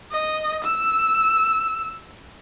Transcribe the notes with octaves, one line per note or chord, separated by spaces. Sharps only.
D#5
E6